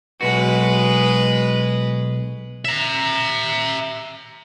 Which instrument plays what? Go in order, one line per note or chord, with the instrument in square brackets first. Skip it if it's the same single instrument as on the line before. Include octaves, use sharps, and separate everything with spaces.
[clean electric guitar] B1 F#4 [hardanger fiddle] G#3 B4
[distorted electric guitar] E5 A#5